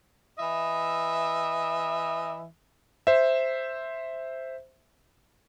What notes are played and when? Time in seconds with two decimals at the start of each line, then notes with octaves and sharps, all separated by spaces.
0.38 E3 D#5 E5
3.07 C5 E5